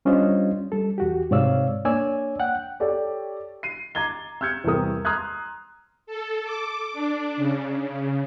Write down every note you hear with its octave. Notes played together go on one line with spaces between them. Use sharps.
G3 C#4 D4 F4 C5 D#5
G3 A4
E2 F#4 G4
G#2 C3 C#5 D5 F5 E6
A#3 D4 C#5 D5 G#5 E6
F#5 G5 F#6
G4 A4 C#5 D5 G5
C7 D#7
A#5 D6 G#6 A6 G7
E6 F6 G6 G#6 C#7
E2 C3 G3 G4 A#4 D#6
A#5 C6 D#6 F6 F#6 G#6
A4
D6
D4
C#3